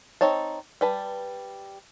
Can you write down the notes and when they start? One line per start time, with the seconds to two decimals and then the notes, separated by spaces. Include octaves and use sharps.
0.21 C4 D#4 C#5 A5
0.81 G3 B4 A5